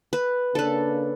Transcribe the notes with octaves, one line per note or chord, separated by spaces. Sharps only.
B4
C#3 A#3 D4 A4 B4